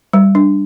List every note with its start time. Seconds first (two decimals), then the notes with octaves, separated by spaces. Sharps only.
0.13 G3
0.35 D4